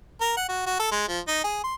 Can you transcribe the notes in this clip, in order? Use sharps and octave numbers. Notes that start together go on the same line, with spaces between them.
A#4
F#5
F#4
F#4
A4
G#3
F3
D#4
G#4
C6